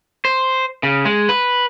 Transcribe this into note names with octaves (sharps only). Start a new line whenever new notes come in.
C5
C#3
G#3
B4